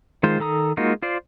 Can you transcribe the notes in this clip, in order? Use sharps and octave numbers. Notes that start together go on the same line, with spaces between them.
D#3 G#3 F4 C5
D#3 A4 A#5 D#6
G#3 A#3 D#4 F4 F#4
F4 C5 D5